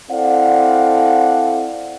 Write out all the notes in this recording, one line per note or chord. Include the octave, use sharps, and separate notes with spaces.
C4 E4 A4 D5 F5 F#5